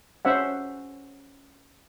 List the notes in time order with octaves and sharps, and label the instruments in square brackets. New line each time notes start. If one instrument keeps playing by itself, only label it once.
[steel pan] C#4 C5 E5 F#5